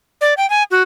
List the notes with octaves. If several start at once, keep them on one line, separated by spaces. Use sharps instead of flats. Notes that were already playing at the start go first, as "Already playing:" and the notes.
D5
G5
G#5
F#4